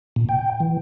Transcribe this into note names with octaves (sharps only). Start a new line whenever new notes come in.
A#2
G5
E3